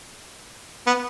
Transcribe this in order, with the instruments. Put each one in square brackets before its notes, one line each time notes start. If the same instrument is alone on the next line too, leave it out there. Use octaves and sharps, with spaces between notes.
[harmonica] B3